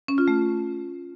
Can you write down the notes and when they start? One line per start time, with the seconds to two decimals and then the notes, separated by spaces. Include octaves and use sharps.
0.08 C#4
0.18 F4
0.28 A3